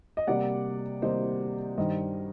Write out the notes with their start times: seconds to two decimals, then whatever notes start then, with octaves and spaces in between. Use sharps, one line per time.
0.17 D#5
0.27 C3 G3 A#3 D5 F#5
1.02 C3 G3 A#3 C5 D#5
1.78 G2 D#3 G3 C5 D#5